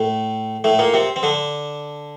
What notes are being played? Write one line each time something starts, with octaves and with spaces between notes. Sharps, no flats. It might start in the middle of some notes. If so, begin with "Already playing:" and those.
Already playing: A2 A3
A2 A3
A#2 A#3
C3 C4
C4
D3 D4